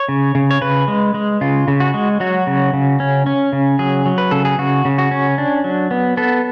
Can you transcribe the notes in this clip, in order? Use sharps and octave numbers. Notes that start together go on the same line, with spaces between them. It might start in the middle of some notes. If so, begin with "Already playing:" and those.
Already playing: C#5
C#3
C#3
C#5
C#3 B4
G#3
G#3
C#3 F4
C#3
F#4
G#3
F#3 F#4
C#3
C#3
C#4
C#4
C#3
F#3 G#4
F#3
B4
C#3 A4
G#4
C#3 F#4
C#3
F#4
C#4
D4
F#3
B3
B3 A4